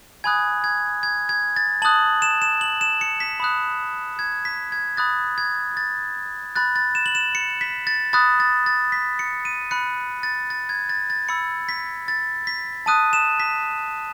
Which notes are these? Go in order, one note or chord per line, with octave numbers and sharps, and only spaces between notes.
G#5 B5 D#6 F#6 G#6
G#6
G#6
G#6
A6
A5 D#6 F#6 F#7
E7
E7
F#7
E7
C#7
B6
B5 D#6 F#6
G#6
B6
G#6
B5 D#6 F#6 A6
G#6
A6
B5 F#6 A6
A6
E7
F#7
E7
C#7
B6
A6
B5 D#6 F#6 A6
A6
A6
B6
C#7
D#7
B5 F#6 C#7
A6
A6
G#6
A6
A6
B5 E6 C#7
B6
A6
B6
A5 D#6 F#6 D#7
E7
B6